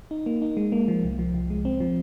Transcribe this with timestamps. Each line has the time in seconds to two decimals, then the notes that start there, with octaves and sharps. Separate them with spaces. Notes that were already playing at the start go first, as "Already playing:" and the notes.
0.11 D#4
0.26 A#3
0.42 D#4
0.57 G#3
0.72 A#3
0.88 F3
1.04 C2
1.19 F3
1.34 C2
1.50 G#3
1.65 C4
1.80 F3